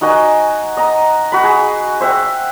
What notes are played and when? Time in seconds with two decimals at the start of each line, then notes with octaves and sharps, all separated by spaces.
0.01 D#4 F#4 D#5 G#5
0.77 D#5 A#5
1.32 F#4 B5
1.44 G#4
2.00 C5 E5 F#5 G5